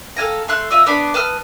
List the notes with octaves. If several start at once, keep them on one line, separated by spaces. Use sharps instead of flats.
A4 F5 G#5 A#5
A3 C6 F#6
F4 D#5 E5 E6
B3 D4 B5
B4 A5 D#6 F6